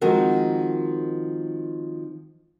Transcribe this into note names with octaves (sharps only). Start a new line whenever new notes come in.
D#3 F3 G#3 C4 F#4 A#4